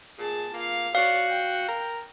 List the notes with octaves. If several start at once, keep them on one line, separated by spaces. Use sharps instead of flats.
A#2 G#4 A5
A#3 F4 F5
F#4 C#5 D5 F5
G5
A#4